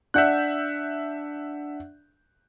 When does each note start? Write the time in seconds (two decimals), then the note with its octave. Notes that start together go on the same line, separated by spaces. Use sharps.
0.14 D4 E5 F#5 F#6 G6